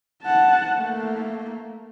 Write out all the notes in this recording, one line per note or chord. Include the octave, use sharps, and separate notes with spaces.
F#5 A5
A3 A#3